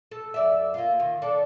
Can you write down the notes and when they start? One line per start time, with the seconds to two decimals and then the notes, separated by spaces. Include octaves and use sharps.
0.11 A4
0.34 F#2 D5 E5
0.74 A#3 F4
1.00 D#3
1.22 D4 A4 D5